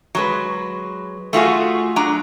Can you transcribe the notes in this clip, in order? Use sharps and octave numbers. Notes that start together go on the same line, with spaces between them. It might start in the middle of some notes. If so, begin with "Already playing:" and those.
F#3 G#3 B4
A3 F4 F#4 G#4
F#3 D4 A#5